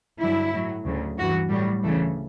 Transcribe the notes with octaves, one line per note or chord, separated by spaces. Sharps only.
G2 D3 F#3 E4
A2 F#3
D2 C#3 F#3
G2 E3 F#4
A2 F#3 G3
D2 C#3 E3 A3